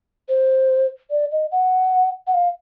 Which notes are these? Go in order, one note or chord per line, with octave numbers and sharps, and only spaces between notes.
C5
D5
D#5
F#5
F#5
F5